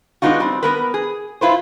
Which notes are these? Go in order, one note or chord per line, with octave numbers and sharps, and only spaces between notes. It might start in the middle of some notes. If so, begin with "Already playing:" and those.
G#3 B3 D4 D#4 F4 F#4
G3 C4
B3 A#4 B4
G#4
E4 F4 B4 C5